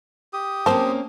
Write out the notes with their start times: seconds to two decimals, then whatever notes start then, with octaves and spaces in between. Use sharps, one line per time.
0.33 G4 D#6
0.66 A#3 C4 C#4 C5 A5